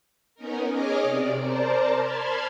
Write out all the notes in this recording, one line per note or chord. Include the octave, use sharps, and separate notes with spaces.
B3 C#4 D#4 A#4
G#4 C#5 D#5 D6 F6
C3 D5
A#4 C5 D5 A5 A#5
A5 B5 C6 F6 G#6